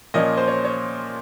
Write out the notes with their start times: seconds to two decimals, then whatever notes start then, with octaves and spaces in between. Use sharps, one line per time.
0.14 A#2 F3 A#3 C#4 D#5
0.37 C5
0.48 C#5
0.64 C#5